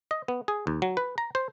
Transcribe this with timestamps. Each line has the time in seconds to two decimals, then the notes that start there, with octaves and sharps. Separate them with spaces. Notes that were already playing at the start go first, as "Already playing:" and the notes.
0.11 D#5
0.28 B3
0.48 G#4
0.67 D#2
0.82 F#3
0.97 B4
1.18 A#5
1.35 C5